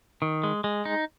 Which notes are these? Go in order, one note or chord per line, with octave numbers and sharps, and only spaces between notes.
D#3
G#3
G#3
D#4